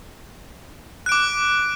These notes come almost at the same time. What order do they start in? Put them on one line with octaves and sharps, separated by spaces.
F#6 D7 D6